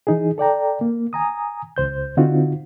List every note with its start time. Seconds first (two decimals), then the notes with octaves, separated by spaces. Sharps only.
0.07 E3 D#4 G#4
0.38 A4 D5 G5 A#5
0.81 A#3
1.13 G#5 A#5 D#6
1.76 C#2 C5 G6
2.17 D3 C4 D#4 F4 F#4